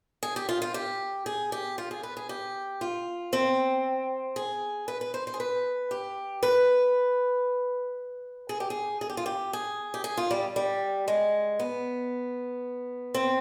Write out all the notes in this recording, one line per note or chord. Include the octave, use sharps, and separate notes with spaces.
G#4
G4
F4
F4
G4
G#4
G4
F4
G#4
B4
G#4
G4
F4
C4
G#4
B4
B4
C5
C5
G#4
B4
G4
B4
G#4
G4
G#4
G#4
G4
F4
G4
G#4
G4
G#4
F4
G3
G3
G#3
B3
C4